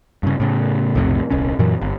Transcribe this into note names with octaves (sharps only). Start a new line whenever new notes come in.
G2 C#3
A2 C#3
B1 F2 A2 C3
D#1 C2 C#4
F#2 A#2 E3 F#3
G1